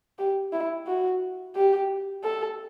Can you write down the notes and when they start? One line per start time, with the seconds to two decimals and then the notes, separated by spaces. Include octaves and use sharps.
0.19 G4
0.53 E4
0.87 F#4
1.56 G4
2.24 A4